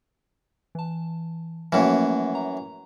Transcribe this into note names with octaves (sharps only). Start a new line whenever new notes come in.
E3 A5
F#2 E3 F3 A3 A#3
A#5